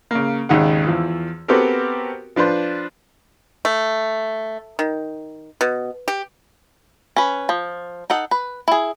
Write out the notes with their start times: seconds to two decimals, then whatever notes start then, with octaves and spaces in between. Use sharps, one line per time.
0.11 C#3 A#3
0.49 G#1 D#2 C#3 D#4 G#4 F#5
0.87 E2 E3 F3
1.48 B3 C4 F#4 G4 A4 A#4
2.36 F3 D4 B4 C5
3.65 A3
4.79 D#3
5.61 B2
6.08 G4
7.16 C#4 B4
7.49 F3
8.10 D#4 A4 F#5
8.31 B4
8.68 E4 G#4